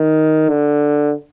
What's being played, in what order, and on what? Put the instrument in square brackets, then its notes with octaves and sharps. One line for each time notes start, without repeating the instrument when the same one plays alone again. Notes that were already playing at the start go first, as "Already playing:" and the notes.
Already playing: [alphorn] D#3
D3